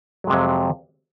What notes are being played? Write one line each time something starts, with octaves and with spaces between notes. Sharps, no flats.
F2 C3 F#3 G#3